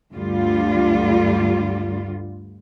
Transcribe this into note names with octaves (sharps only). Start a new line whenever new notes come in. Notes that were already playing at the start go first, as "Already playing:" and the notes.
D2 G2 D3 G3 F4